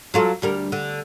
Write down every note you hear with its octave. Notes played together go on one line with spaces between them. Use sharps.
F#3 F4 A4
D2 G3 A#4
D3